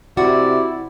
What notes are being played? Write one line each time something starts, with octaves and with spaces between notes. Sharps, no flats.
C3 E4 F#4 D5